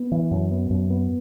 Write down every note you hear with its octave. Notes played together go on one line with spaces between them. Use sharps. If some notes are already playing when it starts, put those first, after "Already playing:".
Already playing: B3
E3
F#2
B3
F#2
B3